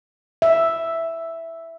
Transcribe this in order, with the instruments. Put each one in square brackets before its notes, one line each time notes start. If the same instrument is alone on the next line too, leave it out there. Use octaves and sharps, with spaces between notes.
[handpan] E5